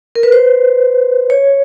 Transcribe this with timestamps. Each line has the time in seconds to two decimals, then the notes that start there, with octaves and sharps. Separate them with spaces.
0.15 A#4
0.23 B4
0.32 C5
1.30 C#5